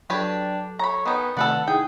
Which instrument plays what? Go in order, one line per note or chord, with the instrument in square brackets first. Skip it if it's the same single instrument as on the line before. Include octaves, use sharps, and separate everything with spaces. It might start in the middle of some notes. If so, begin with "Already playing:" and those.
[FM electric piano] F#3 A4 [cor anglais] D4 [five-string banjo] G4 B4 C#5
[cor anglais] C#5 [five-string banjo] A#5 B5
[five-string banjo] D#3 D#4 [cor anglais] B3 [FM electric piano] G#5
[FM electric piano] C3 D#3 A3 [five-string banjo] A4 B4 D5 [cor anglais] F#5
[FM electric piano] D#4 E4 [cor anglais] G#4 [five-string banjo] G5